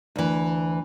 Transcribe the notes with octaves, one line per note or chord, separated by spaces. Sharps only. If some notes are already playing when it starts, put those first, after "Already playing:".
D2 E3